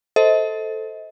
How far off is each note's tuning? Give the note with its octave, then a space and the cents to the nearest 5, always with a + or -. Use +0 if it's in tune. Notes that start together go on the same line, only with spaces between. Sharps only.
A4 +0 C5 +0 D#5 +35